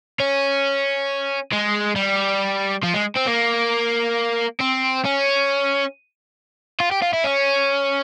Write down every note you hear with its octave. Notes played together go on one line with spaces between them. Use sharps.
C#4
G#3
G3
F3
G#3
C4
A#3
C4
C#4
F4
G4
F4
E4
C#4